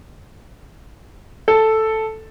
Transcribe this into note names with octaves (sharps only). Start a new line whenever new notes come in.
A4